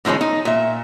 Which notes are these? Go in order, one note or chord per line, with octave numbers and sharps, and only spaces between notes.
A2 D#3 F3 G#3 C#4
D#4
A#2 E5